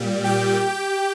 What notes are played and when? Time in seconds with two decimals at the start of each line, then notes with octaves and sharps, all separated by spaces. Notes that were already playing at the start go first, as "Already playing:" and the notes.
Already playing: A#2 G3
0.24 G4 G5